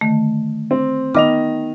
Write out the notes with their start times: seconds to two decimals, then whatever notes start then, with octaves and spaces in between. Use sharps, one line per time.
0.01 D3 D#3 A3
0.71 C4
1.14 D#3 B3 D#5 D6 F6 F7